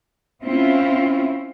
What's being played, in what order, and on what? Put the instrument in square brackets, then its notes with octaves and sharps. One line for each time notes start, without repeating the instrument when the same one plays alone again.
[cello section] C4 C#4 E4 F4